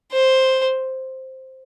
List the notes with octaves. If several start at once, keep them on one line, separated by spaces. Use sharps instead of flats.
C5